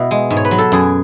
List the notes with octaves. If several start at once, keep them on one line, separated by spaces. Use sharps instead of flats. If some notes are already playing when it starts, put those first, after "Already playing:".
Already playing: B2 E4 F#4
G#3
G#2
C#5
B4
F#3
A4
F#2 G#4